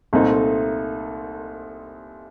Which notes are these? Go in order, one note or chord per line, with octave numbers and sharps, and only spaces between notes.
C2 A#2 A3 C4 D#4